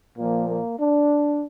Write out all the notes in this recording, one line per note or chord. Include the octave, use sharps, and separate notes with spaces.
A#2 F3 A#3
A#3
D4